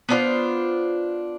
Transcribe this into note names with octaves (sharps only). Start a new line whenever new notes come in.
B3 D4 F4 C5